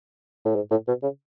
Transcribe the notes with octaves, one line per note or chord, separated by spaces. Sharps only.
A2
G#2
A2
B2
C#3